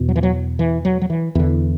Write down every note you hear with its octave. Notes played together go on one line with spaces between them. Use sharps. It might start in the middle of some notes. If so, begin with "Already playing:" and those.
Already playing: E2 B2
F#3
E3
F#3
E3
F#3
F#3
E3
E2 D3 E3